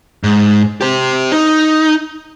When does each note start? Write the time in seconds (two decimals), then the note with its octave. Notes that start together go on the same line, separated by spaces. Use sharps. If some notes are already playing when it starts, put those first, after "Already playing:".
0.24 G#2
0.81 G4 C5
1.32 D#4